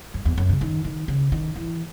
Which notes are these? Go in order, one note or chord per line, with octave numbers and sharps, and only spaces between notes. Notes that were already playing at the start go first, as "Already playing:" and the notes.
F#2
E2
F#2
C#3
D#3
D#3
C#3
D#3
E3